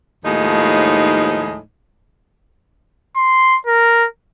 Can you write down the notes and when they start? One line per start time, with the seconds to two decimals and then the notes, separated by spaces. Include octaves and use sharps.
0.25 D#2 A2 F3 G#3 D#4
3.16 C6
3.67 A#4